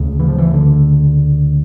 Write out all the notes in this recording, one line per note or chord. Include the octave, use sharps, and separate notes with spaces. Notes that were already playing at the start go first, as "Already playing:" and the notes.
Already playing: D2 C#3
E3
F3
E3
D3